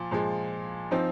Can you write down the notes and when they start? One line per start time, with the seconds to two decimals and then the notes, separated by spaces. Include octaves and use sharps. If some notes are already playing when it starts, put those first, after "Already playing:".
Already playing: A#2 F3
0.11 A#2 F3 G#3
0.91 F3 C4 D#4